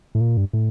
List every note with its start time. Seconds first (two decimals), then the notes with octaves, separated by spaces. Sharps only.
0.15 A2
0.21 A#2
0.37 G2
0.53 A2